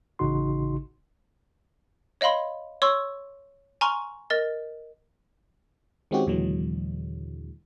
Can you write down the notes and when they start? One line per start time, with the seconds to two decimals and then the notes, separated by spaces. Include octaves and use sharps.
0.19 A1 C#3 D#4 F#4 C6
2.21 C#5 D#5 F5 B5 C6
2.82 C#5 C6 C#6 E6
3.81 G#5 A#5 C6 C#6 F6
4.30 A#4 D#5 A6
6.11 D#3 G#3 C4 C#4 F#4 G4
6.27 D#2 A#2 D3 E3 F#3 G#3